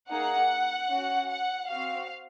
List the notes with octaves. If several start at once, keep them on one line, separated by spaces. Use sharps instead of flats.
A#3 D#4 G#4 F#5
C#4 F#4
F#5
C4 F#4 F5